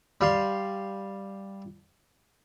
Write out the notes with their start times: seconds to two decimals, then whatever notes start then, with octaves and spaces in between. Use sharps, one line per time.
0.21 G3 F5 C6